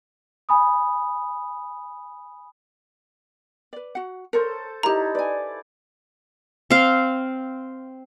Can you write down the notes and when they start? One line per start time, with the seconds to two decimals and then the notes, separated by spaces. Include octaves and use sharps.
0.49 G#5 B5 D#6
3.73 B4 D5
3.95 F#4 F#5
4.33 A4 A#4 C5 C#5
4.83 D#4 E4 G4 A#4 A#5
5.15 B4 D5 G#5
6.70 C4 F5